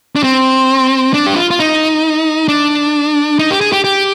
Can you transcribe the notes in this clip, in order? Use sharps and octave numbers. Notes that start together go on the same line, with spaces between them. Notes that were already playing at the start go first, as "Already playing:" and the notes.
D4
C4
D4
G4
F4
F4
D#4
D4
D#4
G4
G#4
G4
G4